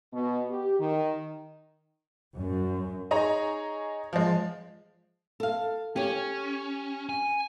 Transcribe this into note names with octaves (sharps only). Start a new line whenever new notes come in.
B2
G4
D#3
F#2
D#4 G#4 C#5 A#5
F3 G#3
A4 F5
C#4 G4 C#5
G#5